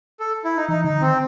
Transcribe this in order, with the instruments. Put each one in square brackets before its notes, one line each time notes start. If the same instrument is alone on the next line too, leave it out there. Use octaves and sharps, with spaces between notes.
[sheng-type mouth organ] A4
E4
D#4
[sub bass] E3 [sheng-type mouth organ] D#4
[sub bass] D3 [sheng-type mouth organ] D#4
[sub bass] D#3 [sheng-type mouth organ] C4